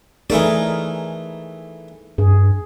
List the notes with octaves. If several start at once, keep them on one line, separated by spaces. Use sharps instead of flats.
E3 A3 D#4 G#4 A#4 D5
G2 G#4